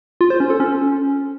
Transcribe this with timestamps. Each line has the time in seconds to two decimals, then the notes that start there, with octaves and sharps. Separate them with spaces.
0.21 F4
0.30 C5
0.40 C#4
0.50 A4
0.60 C#4